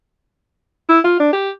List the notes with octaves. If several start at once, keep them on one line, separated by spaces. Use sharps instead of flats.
E4
F4
D4
G4